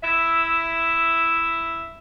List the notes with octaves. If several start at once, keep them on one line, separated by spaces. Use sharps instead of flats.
E4 E5